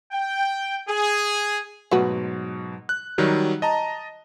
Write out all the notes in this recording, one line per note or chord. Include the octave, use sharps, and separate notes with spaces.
G5
G#4
G#2 B2 F#3 A3 F#4 B4
F#6
D#3 F#3 G3
D#5 A5 A#5